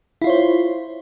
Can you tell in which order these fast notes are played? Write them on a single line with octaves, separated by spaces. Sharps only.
E4 F4 C#5 C5